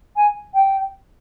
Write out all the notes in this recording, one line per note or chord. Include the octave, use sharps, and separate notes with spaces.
G#5
G5